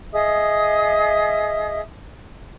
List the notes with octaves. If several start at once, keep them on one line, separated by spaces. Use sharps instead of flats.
G#4 D#5 E5 D#6